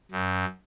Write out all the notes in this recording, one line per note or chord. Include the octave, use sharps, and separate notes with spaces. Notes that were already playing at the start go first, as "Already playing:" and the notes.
F#2